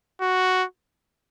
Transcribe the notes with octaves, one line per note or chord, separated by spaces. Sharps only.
F#4